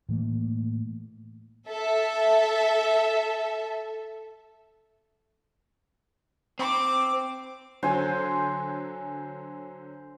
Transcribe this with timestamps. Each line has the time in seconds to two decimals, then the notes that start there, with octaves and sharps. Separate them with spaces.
0.09 A2 E3 A3 A#3
1.69 A4 E5
6.59 C4 D6
7.83 D3 F#3 C5 G#5